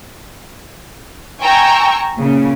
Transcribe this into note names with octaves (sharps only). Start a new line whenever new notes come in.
G5 G#5 A#5 C#6 E6
A#2 C#3